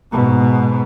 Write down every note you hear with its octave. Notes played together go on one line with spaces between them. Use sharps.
G#2 B2